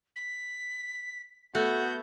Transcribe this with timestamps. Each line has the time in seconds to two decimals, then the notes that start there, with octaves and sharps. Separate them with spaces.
0.16 B6
1.55 A3 B3 F#4 G6